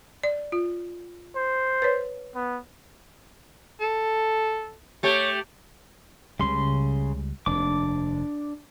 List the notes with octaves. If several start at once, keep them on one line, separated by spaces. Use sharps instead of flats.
D5
F4
C5
B4 C#5
B3
A4
A3 G4 C#5
C#2 C#3 G3 C6
F1 D#2 D4 D6